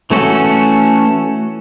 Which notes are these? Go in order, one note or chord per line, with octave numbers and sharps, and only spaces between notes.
E3 A3 C#4 F#4 A4